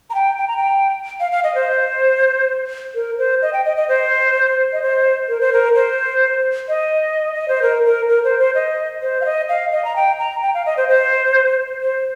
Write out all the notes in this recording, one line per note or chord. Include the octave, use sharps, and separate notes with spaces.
A#5
G5
G5
A#5
G5
F5
F5
D#5
C5
A#4
C5
D#5
G5
D#5
D#5
C5
D#5
C5
A#4
C5
A#4
C5
D#5
D#5
C5
A#4
A#4
A#4
C5
C5
D#5
C5
F5
D#5
F5
D#5
A#5
G5
A#5
G5
F5
D#5
C5
C5
C5